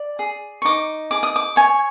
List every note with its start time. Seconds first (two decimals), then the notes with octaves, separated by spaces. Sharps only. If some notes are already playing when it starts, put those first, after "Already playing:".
Already playing: D5
0.19 G#4
0.62 C#6
0.65 D#4 D6
1.11 G#4 D6
1.23 D#6
1.36 D6
1.56 C#5 G#5